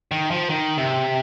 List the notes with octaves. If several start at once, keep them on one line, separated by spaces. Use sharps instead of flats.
D#3
F3
D#3
C3